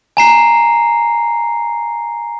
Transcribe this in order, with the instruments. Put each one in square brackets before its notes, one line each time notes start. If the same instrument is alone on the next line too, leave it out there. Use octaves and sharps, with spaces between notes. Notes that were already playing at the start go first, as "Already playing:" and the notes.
[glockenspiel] G#5 A#5 C7